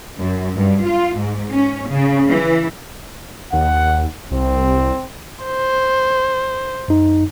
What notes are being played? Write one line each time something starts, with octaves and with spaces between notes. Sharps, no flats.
F#2
G2
F4
G#2
C#4
C#3
E3
D#2 F#5
C2 C4
C5
F#2 D#4